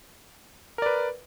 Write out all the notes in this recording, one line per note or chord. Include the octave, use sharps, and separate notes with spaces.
A#4 B4 D5